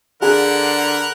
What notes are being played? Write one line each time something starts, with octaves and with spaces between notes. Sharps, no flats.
D3 G#4 A#4 F#5 B5